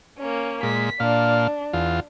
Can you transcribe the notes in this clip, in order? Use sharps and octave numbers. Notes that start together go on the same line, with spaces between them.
A#3 C#4
A#2 G#3 B6
A#2 D4 F5
E2 F4